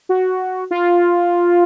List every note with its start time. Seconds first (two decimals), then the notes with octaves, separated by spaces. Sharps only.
0.09 F#4
0.71 F4